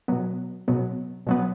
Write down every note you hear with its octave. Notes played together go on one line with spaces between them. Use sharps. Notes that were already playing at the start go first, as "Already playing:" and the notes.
B2 F#3 B3
B2 F#3 B3
B2 F#3 B3